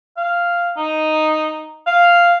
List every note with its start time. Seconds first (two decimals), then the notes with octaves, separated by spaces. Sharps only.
0.17 F5
0.77 D#4
1.87 F5